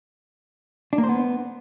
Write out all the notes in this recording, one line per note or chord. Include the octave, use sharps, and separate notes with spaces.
D4
A#3
C5
B3